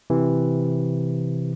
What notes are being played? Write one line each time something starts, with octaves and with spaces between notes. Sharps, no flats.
C3 E3